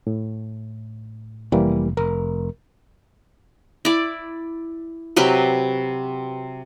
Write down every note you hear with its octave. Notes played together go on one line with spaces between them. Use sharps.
A2
F1 E3 G3 A#3
F1 A#4
E4 D5
C3 F#3 G4 B4